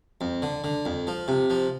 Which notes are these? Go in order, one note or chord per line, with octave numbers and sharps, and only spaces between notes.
F2
D3
D3
F2
F3
C3
F3